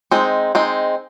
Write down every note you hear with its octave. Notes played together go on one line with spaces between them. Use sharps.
G#3 C4 D#4
G#3 C4 D#4